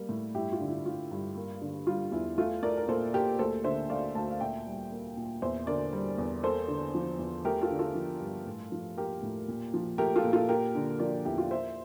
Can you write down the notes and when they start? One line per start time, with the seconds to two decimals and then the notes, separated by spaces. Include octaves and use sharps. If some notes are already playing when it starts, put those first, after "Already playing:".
Already playing: G3 A#3
0.09 A2
0.34 G2 E4 G4
0.52 F4
0.61 D3
0.68 E4
0.85 A3 F4
1.11 G2
1.37 A#3
1.62 D3
1.87 G3 F4
2.12 E2 E4
2.38 A3 F4
2.62 A3 A#4 D5
2.77 A#4
2.88 A#2 A4 C5
3.14 A#2 G4 A#4
3.39 D2 A4 C5
3.64 D3 C5 E5
3.89 A3 D5 F5
4.15 D2 F5 A5
4.31 F5
4.40 A#2 E5 G5
4.67 G3
4.92 A#3
5.17 A#2
5.42 E2 C5 E5
5.67 D3 A#4 D5
5.93 G3
6.18 E2
6.43 A#3 A4 C5
6.68 D3
6.95 F3
7.19 E2
7.44 A3 G4 A#4
7.61 F4 A4
7.71 D3
7.79 F4 A4
7.95 F3
8.20 G2
8.46 A2
8.72 F3
8.97 A#3 G4 A#4
9.23 A2
9.48 A#2
9.74 F3
9.98 A3 G4 A#4
10.16 F4 A4
10.24 A#2
10.33 F4 A4
10.49 A#3 G4 A#4
10.75 D3
10.99 F3 A#4 D5
11.25 E2 E4 G4
11.38 F4
11.51 A#3 C5 E5